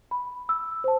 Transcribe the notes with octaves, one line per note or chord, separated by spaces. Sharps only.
B5
E6
C5 A5